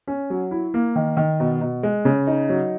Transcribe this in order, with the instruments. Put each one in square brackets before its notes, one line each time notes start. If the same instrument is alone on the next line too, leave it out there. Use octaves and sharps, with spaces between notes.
[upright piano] C#4
F#3
E4
A#3
D#3
D#3
B2
B2
G#3
C#3
D#4
F#3